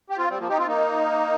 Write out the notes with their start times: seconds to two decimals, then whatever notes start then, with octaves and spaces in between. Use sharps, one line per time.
0.10 G4
0.18 C4 F4
0.30 G3 C4
0.39 F3 A#3
0.49 D#4 G4
0.58 C4 F4
0.68 A#3 D#4